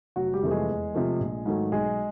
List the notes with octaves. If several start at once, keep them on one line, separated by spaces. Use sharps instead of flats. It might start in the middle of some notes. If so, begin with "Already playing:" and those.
F1 F#3 F#4
G3 G4
F2 C3 E3 A3
G#3 G#4
E2
C3 F3 A3
A#1
G#2 D#3 F#3 A3
B1 G#3 G#4